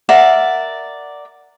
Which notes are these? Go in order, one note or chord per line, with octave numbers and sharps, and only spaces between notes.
A#4 D5 E5 F#5